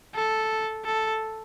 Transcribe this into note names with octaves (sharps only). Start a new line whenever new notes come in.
A4
A4